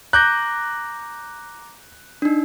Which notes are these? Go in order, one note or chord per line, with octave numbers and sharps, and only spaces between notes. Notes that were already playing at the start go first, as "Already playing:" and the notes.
A#5 D6 F#6 G6 A#6
D4 D#4